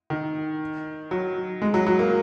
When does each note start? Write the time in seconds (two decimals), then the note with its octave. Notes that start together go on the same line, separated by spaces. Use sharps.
0.10 D#3
1.11 F#3
1.62 G#3
1.74 F#3
1.87 F#3
1.99 A#3